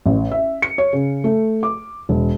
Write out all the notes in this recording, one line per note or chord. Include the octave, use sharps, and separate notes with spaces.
A1
E5
C#7
C#5
C#3
A3
D6
E1